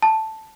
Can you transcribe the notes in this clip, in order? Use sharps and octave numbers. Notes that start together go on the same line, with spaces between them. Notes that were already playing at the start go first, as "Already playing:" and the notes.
A5